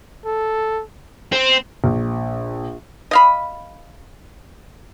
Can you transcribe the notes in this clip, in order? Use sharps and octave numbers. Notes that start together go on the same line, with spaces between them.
A4
C4
A#1
D#5 F5 B5